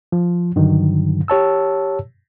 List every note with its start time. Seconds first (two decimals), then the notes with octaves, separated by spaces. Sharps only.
0.12 F3
0.56 G2 D3 D#3 F#3
1.28 G4 C#5 A5 E6